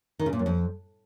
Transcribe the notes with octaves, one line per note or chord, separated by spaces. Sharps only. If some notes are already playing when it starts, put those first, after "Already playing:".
D#3
C#3
A#2
F#2
F2